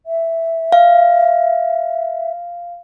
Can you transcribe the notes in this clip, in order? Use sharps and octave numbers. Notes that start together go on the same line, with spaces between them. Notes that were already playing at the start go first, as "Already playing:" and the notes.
E5
F5